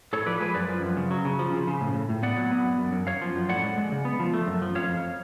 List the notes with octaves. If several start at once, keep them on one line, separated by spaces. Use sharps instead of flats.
A2 A4 C#5
F3 B4 D5
G#3 G#4 B4
F#2 B4 D5
F3
F#2
C#3
F#3
C#3
F3
C#3
C#3
A2
A2
A2
B3 D5 F#5
F#3
B3
F#2
F#2
F#2
F#2 C#5 F5
F3
F#2
A2 D5 F#5
G#3
G#3
C#3
B3
F3
A3
F#2
F3
F2 C#5 F5
F2